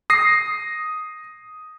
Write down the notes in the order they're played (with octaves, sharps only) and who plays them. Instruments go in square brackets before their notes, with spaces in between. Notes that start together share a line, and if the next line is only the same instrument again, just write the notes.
[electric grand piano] D#6 A#6 C7